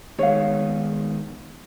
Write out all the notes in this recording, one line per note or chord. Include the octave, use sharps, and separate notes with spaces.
D#3 G#3 B3 C#5 F5